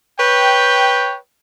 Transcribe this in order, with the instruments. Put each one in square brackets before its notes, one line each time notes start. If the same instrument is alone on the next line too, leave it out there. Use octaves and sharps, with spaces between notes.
[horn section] B4 C#5 G5